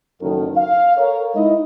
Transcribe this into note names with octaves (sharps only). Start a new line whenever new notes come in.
F#1 D#3 A4
F5
A4 A#4 C#5
G#3 D#4 E4 D#5